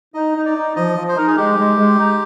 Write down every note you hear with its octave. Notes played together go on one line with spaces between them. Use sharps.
D#4 D#5
D#4
D5
D#4
F3 D#5
F3
C5
D#4 A#4
G#4
G#3 G4
G#3
G#3
D#4